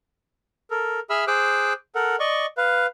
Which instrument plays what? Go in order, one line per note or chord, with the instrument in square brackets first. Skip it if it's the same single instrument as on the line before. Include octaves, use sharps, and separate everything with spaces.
[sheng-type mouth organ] A4 A#4
G#4 E5 B5 E6 F6
G#4 C5 D6 E6 F#6
A4 A#4 F#5
D5 D#5 C#6
B4 F5